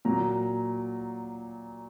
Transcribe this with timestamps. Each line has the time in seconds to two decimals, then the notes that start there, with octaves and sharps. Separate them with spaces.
0.05 A#2 F#3 A#5